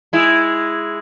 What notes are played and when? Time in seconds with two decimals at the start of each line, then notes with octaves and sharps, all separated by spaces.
0.13 G#3 E4